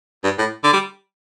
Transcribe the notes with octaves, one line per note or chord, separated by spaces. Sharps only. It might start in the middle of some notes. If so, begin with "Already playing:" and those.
G2
A2
D3
G3